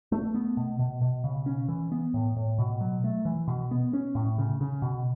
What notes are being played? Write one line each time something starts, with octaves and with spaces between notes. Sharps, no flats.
A3
B3
B2
B2
B2
C#3
C#4
E3
B3
A2
A2
B2
F#3
A3
E3
B2
B3
C#4
A2
C#3
C#3
B2